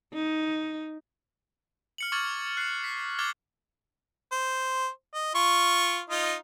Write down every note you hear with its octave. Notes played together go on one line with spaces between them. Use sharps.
D#4
F6 C#7 F#7
C#6 D6 F6 G#6 A6 F#7
F#6 C7
B6
D6 F6 F#6 G#6 A6 G7
C5
D#5
F4 C#6
D#4 F4 D#5